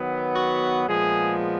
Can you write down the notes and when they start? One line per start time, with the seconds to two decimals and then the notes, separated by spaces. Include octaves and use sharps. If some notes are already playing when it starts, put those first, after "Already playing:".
Already playing: D#3 F#3 B3
0.35 F#4
0.87 A#2 F3 G#3 B3 G#4